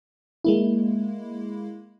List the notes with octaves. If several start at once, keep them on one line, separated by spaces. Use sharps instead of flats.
G#3 A#3 E4